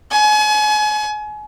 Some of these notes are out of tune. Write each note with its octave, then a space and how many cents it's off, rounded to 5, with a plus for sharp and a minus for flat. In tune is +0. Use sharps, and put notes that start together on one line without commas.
G#5 +35